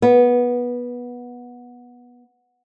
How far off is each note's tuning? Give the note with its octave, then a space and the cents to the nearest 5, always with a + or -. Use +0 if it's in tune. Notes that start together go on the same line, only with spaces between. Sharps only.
B3 -15